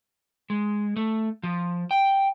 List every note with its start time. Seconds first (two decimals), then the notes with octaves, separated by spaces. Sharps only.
0.50 G#3
0.96 A3
1.43 F3
1.91 G5